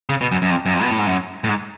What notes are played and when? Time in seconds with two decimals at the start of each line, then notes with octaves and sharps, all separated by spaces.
0.10 C#3
0.21 B2
0.32 F#2
0.42 F#2
0.50 F2
0.66 F#2
0.74 F2
0.83 B2
0.90 A2
0.99 G#2
1.07 F#2
1.44 A2
1.49 G#2